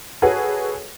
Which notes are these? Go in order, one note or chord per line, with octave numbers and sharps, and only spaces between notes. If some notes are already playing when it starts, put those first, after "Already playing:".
F#4 G#4 A4 B4 C#5